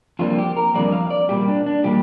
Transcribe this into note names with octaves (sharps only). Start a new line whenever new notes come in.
F2 D3 G3 A#3 F4
G4
A#4
F2 D3 G3 A#3 D5
F5
D5
A#2 G3 A#3 G4
D4
D4
A#2 G3 A#3 G4